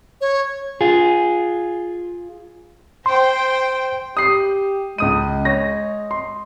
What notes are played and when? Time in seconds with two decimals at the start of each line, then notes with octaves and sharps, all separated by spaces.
0.21 C#5
0.81 F4 G#4
3.06 C5 G5 C6
4.17 G4 D#6 C7
4.98 C#2 G#3 D#6 D#7
5.45 C#5 A#6
6.11 C6